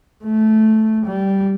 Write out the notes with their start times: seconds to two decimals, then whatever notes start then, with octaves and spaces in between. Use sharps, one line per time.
0.24 A3
1.06 G3